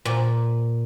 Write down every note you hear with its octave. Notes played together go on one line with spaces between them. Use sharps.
A#2